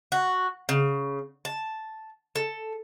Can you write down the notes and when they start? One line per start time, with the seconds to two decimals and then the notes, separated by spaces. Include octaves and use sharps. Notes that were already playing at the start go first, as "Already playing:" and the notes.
0.12 F#4
0.69 C#3
1.45 A5
2.36 A4